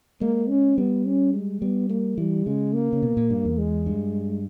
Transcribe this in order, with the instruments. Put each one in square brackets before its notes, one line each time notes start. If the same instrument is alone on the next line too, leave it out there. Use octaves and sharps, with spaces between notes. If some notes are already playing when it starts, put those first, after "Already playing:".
[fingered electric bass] G#3 [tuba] A#3
[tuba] C#4
[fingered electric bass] G3 [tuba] B3
[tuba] C#4
G#3
[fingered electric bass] G3 [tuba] B3
[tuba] A#3
[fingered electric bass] E3 [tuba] G3
[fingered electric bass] C#3 [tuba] G#3
[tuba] A#3
[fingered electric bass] C#3
B2
A#2
G2
E2
[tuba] G#3
[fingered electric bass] G2